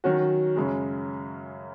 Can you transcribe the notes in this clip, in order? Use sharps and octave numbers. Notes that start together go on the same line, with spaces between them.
D#3 F#3 C#4 F#4
F#2 C#3 G#3